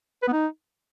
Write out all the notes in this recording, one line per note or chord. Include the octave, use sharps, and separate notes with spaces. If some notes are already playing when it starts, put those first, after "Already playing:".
B4
B3
D#4